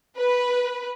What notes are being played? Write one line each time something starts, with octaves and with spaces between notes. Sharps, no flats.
B4